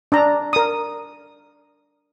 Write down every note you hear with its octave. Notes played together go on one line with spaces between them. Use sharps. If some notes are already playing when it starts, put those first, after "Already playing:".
D4 D5 A#5
A#4 D#6